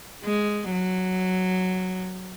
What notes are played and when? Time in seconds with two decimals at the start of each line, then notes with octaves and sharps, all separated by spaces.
0.24 G#3
0.71 F#3